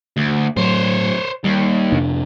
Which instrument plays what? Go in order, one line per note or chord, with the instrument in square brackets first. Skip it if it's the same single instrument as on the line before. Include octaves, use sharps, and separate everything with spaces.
[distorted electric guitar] D2
[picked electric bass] A2 F#3 [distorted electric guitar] C5 C#5
[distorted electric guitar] D#2 [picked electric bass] G3
[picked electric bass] F2 C3 D4